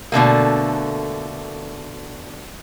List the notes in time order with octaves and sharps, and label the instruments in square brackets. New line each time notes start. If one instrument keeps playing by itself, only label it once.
[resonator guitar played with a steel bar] B2 D3 A3 A#3